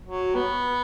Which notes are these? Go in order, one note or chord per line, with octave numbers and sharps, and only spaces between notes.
F#3
B3